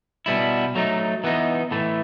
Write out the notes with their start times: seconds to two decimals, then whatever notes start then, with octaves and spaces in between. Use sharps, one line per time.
0.26 B2 G3 B3 E4
0.75 F#3 A3 D#4
1.24 E3 B3 D#4
1.71 A2 E3 A3